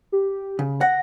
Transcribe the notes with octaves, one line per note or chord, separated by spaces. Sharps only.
G4
C#3
F#5 A#6